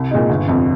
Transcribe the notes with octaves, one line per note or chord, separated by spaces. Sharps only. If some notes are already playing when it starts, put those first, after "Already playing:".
Already playing: C2
A#2 G#3 D#4
G1
F2 C3